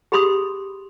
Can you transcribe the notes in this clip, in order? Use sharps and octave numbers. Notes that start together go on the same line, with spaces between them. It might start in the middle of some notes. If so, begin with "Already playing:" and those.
G4 G#4 B5 C6 D#6